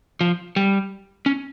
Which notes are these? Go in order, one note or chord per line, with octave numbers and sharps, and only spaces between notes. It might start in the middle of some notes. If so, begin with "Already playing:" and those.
F3
G3
C#4